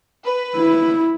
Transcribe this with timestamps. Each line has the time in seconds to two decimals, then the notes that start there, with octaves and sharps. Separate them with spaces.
0.24 B4
0.56 E4